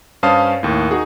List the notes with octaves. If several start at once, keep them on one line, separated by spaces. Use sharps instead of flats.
G2 C#4 C5 F5 A5 D#6
D#2 A2
D#4 F#4 G#4